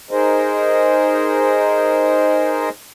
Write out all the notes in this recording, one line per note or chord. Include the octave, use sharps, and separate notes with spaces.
D#4 G#4 A#4 C5 D#5